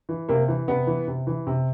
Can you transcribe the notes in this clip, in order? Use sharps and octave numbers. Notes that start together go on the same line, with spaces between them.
E3
C3 A#3
E3
C3 B3
E3
C3
E3
C3